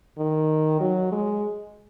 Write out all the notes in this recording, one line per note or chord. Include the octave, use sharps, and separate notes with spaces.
D#3
F#3
G#3